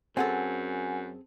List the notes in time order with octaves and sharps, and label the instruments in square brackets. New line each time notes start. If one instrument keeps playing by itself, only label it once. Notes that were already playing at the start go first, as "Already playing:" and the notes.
[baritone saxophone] F#2 [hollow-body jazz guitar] C4 G#4 A4 [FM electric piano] F#5 G#5